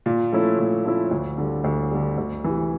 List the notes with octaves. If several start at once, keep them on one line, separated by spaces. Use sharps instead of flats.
A#2
F3 A3 C#4 E4
A#2
F3 A3 C#4 E4
D2
D3 G3
D2
D3 G3
D2
C3 E3